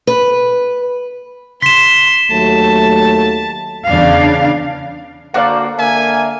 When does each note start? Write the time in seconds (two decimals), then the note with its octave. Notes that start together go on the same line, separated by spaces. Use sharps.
0.07 B4
1.62 C6 B6 E7
2.31 D#2 F#3 A3 A5
3.88 E2 C#3 D4 F5
5.34 D3 A#3 F#4 C5 D5 F5 F#5 D6
5.79 D3 A#3 E5 G#5